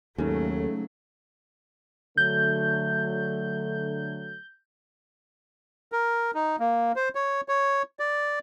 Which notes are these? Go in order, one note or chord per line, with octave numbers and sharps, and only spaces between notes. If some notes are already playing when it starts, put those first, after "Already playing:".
D#2 G#2 C#3 F#3 A3
D3 F#3 A3 G6
A#4
D#4
A#3
C5
C#5
C#5
D5